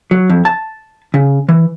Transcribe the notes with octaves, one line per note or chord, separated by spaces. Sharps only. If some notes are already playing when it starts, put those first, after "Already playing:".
F#3
F2
A5
C#3
E3